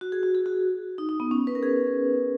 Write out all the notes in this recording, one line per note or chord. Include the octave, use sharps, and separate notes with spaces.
F#4
G#4
F#4
G#4
F#4
D#4
D#4
B3
C#4
B4
A#4
G#4